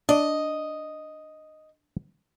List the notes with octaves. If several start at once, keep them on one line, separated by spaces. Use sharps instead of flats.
D4 D5 D#5